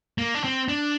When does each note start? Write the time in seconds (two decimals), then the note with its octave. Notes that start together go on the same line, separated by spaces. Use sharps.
0.18 A#3
0.34 D4
0.44 C4
0.69 D4